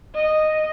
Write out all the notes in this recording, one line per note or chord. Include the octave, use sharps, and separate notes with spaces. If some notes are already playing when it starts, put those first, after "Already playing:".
D#5